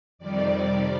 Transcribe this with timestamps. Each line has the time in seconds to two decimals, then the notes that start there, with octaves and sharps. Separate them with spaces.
0.19 F2 C3 D#3 G3 D5